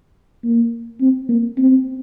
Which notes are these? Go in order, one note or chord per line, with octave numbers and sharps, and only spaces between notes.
A#3
C4
A#3
C4